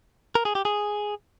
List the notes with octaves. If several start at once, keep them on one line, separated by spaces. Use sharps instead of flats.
A#4
G#4
G4
G#4